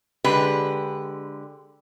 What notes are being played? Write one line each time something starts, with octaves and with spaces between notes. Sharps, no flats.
D3 G#3 G4 B4